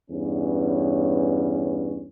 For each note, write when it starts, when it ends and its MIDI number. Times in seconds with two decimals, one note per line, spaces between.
0.11 2.06 40
0.11 2.06 43
0.11 2.06 61